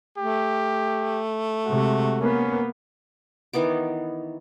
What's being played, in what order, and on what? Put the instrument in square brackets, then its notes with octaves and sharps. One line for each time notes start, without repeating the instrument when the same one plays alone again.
[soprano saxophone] A3 [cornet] G4
[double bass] C3 G#3 [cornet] F#4
[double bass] A#3 B3 [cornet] C#4
[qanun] D#3 E3 B3 D6